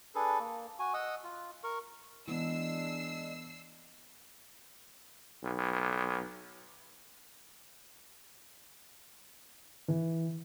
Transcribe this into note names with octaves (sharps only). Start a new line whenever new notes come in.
D4 G#4 A4 B4
A#3
F#4 G#5
D#5 F#5 D#6 E6
F4
A#4 C#6
E3 G#3 B3 D4 E6 C7
B1
E3